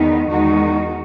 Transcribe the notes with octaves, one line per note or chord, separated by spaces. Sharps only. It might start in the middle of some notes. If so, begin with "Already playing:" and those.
Already playing: E2 D#3 G#3 B3 D#4
E2 D#3 G#3 D#4 F#4